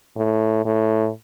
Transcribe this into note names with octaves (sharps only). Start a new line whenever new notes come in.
A2
A2